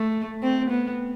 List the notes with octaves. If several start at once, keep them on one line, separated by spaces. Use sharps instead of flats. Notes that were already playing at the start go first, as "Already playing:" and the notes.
Already playing: A3
C4
B3